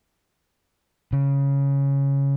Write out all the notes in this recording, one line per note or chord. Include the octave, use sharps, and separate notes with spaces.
C#3